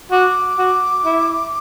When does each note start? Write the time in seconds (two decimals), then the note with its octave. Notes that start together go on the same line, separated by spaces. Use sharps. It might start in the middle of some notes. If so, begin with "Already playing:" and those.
0.11 F#4 D6
0.58 F#4
1.05 E4